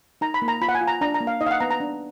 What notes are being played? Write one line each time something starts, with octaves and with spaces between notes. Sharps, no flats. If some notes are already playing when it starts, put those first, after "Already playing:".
D#4 A#5
B5
A#3
A#5
F4 B5
F#5
G#5
F4
A#5
D4 A#5
A#5
A#3
F5
D#4 D#5
F5
F#5
B3 A#5
A#5
D4